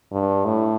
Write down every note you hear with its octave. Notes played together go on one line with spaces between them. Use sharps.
G2
A2